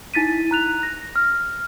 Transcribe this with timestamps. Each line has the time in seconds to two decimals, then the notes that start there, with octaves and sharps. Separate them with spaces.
0.14 D#4 E4 A6 B6 D#7
0.51 A#5 F#6 F7
0.83 A#6
1.16 F6